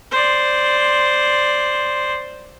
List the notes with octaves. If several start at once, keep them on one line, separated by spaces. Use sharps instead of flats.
C5 D5